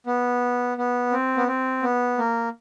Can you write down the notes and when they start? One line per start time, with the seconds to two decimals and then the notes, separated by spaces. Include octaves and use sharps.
0.07 B3
0.78 B3
1.12 C4
1.37 B3
1.48 C4
1.82 B3
2.18 A#3